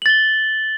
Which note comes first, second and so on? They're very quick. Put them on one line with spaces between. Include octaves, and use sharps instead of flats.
F#7 A6 G7